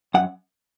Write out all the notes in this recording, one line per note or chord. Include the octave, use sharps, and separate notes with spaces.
F#2 F#5